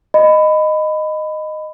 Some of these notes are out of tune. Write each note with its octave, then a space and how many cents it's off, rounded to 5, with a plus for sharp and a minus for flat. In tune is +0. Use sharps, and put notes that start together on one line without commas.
D#5 -10 B5 +20